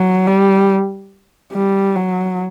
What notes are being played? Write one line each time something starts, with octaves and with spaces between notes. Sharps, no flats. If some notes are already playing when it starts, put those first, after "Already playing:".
Already playing: F#3
G3
G3
F#3